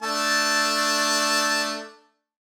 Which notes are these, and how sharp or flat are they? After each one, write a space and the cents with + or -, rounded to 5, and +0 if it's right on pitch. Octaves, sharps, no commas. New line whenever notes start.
A3 +0 D4 +0 A5 +0